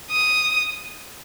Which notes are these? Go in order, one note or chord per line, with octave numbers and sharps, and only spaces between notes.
D#6